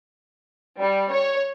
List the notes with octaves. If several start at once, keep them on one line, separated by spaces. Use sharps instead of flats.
G3
C#5